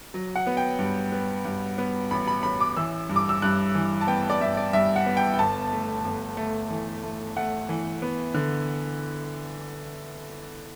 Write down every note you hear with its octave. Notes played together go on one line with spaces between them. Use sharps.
F#3
F#5
B3
G5
G2
B3
G2
B3
A1 B5
B5
A1 B5
D6
E3 E6
G2
D6
E6
G2 F#6
E3
A5
B3 G5
D5
G2 E5
D5
G2 E5
F#5
B3
G5
G5
G1 A5
A3
G1
A3
E3
A3
A3 F#5
E3
B3
D3